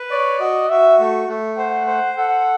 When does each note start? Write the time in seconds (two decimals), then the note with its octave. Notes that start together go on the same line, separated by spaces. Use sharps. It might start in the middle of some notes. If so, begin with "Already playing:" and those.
Already playing: B4
0.11 C#5 D5
0.40 F#4 D#5
0.70 F#4 E5
0.99 A3
1.28 A3
1.58 C5 F#5
1.87 C5
2.17 A4 F#5